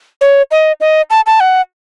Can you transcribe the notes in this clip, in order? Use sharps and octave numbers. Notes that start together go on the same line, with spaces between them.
C#5
D#5
D#5
A5
A5
F#5